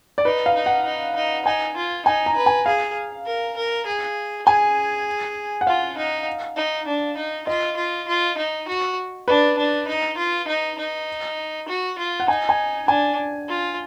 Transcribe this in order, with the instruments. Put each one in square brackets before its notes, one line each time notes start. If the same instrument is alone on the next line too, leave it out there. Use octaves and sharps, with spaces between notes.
[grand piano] D5
[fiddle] D#4 [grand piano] B4
[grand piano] F5
[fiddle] D#4
[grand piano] F#5
[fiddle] D#4
D#4
[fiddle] D#4 [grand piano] G#5
[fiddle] F4
[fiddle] D#4 [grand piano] G#5
[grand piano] A#5
[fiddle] B4
[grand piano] G#5
[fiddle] G#4 [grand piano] F5
[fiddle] A#4
A#4
G#4
[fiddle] G#4 [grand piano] G#5
[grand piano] F#5
[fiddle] F4 [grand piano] F5
[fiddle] D#4
D#4
D4
D#4
[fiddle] F4 [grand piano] D#5
[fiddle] F4
F4
D#4
F#4
[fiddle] D4 [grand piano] B4
[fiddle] D4
D#4
F4
D#4
D#4
F#4
F4
[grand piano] F#5
[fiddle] D#4 [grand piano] G#5
[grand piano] G#5
[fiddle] D4 [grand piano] G#5
[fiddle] F4